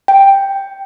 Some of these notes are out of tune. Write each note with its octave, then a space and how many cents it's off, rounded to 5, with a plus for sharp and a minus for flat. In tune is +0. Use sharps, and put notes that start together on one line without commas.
G5 +5